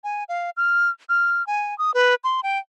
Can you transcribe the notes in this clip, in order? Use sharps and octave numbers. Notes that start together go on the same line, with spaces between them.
G#5
F5
F6
F6
G#5
D#6
B4
C6
G5